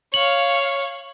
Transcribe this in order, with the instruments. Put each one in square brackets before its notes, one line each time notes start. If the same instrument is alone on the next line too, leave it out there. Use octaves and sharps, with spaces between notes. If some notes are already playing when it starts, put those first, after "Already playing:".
[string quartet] C#5 F5 [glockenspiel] F#7